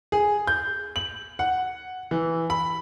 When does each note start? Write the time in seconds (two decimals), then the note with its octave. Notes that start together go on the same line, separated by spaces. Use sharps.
0.12 G#4
0.47 G6
0.96 F#7
1.39 F#5
2.11 E3
2.50 B5